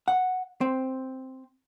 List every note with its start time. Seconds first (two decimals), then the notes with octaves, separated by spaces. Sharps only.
0.08 F#5
0.61 C4